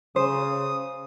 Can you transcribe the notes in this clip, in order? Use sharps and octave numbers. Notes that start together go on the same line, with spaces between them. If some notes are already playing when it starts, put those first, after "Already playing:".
C#3 C5 D#6